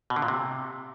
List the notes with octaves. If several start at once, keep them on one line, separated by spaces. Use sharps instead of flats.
B2
D3
A#2
C3